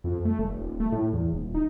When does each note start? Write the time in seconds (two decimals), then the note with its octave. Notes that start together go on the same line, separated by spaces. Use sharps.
0.04 F2
0.25 A3
0.39 F1
0.59 D#1
0.80 A3
0.92 A2
1.13 E2
1.33 D#1
1.55 D#4